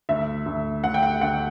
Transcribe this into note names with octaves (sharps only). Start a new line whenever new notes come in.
D2 E5
D2
D2 F#5
G5
F#5
D2 F#5